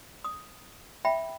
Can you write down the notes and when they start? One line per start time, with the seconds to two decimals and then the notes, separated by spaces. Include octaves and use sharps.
0.24 D#6
1.05 E5 G5 B5